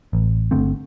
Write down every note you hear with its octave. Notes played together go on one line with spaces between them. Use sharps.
A1
G1 D3 A3 C4